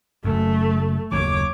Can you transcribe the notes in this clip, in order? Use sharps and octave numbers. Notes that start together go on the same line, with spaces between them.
F#1 F#2 A3
F#1 D#2 D#3 C#5 D6